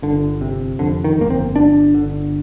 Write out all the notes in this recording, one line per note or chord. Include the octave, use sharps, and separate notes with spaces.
G1 D3
C3
F2 D3
D#3
G1 A#3
C4
G1 D4
D3